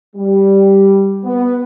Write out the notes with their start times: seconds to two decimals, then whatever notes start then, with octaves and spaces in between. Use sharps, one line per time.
0.16 G3
1.24 B3